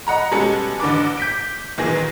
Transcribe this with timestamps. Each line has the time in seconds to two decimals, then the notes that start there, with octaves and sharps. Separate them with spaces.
0.07 D#5 F#5 A#5 B5
0.31 B2 G3 G#3 C#4 A4 C#7
0.80 A1 D3 D4 B4 D6
1.18 G6 B6 D7
1.78 B1 A#2 D#3 E3 G#4 A#6